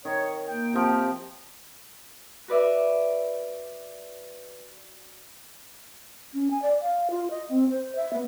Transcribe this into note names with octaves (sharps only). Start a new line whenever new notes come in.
D#3 C#5
A#3 G5
C3 F3
F#4 B4 D5 E5
C#4
G#5
D5
F5
F4
D#5
C4
C5
E5
B3